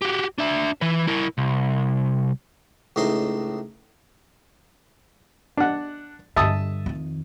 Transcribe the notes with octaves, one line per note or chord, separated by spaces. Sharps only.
F#4 G4
D4 E5
E3 B4
E4 A#4
C2
C#2 A2 D#4 C5 C6
D4 F#5
G2 D3 E5 A5 D#6
F2 D#3